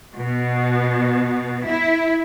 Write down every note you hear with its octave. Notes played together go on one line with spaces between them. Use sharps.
B2
E4